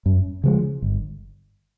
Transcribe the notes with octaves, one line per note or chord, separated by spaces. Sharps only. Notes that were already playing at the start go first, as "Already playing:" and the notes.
F#2
C#3 F3 G#3
G1